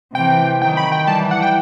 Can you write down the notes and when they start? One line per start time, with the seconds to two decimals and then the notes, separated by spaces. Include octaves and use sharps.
0.15 C3 E3 G5
0.61 D#3 F#3 G5
0.77 B5
0.92 G5
1.07 E3 G3 A5
1.31 F#5
1.42 G5